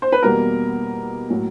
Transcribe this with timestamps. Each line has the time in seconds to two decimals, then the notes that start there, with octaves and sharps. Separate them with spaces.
0.02 C5
0.12 B4
0.23 E2 B2 G3 A#3 A#4
1.30 A2 F#3 A#3